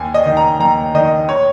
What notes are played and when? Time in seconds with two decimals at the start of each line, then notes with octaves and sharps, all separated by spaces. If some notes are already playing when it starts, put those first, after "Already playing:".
Already playing: D#2 G#5
0.14 D#5
0.26 D#3
0.37 A#5
0.60 D#2 A#5
0.94 D#3 D#5
1.29 C#5